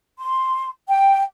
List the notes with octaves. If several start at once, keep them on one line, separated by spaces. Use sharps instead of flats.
C6
G5